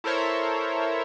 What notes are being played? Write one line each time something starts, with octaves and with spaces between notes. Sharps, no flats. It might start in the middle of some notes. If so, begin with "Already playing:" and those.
E4 A4 A#4 C5 C#5 E5